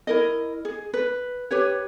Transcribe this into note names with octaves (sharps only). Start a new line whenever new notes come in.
E4 A#4 D#5
G#4
B4
G4 B4 C#5